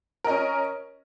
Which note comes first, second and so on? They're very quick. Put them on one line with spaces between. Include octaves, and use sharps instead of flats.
A#4 D#5 C#4